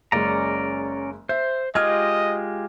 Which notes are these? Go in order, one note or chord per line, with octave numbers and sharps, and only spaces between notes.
F#1 G#3 C#4 D5 A#5
C5 E5
G#3 F4 G4 D#5 F6 G#6